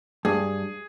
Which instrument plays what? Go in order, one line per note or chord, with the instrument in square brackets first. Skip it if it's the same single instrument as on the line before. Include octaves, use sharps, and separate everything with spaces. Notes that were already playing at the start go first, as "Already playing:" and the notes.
[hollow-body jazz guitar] G2 [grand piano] G#4